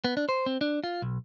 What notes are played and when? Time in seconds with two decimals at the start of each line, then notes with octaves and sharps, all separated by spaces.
0.04 B3
0.17 D4
0.29 C5
0.46 C4
0.61 D4
0.84 F4
1.02 B1